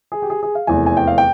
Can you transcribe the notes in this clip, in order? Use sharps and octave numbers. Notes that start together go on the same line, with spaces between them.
G#4
G4
G#4
G#4
F5
F1 E2 E3 G#5
G#5
G5
F5
G5